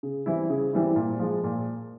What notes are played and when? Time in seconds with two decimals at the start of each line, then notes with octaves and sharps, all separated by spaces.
0.03 C#3
0.26 E3 G3 C4 E4
0.50 C#3
0.73 E3 G3 C4 E4
0.96 A#2
1.19 F3 G#3
1.44 A#2